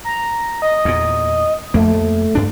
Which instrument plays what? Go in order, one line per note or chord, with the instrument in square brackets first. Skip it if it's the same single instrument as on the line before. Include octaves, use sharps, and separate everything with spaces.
[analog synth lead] A#5
D#5
[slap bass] E2 A#2
[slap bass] F2 A#3 [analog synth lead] A3
[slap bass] G2 D4